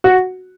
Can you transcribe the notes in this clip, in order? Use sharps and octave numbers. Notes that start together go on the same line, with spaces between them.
F#4